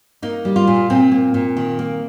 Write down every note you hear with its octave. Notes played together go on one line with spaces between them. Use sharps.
A#3 D#4
G3
F4
A#2
A#2 C4
A#3
A#2
D#3
A#3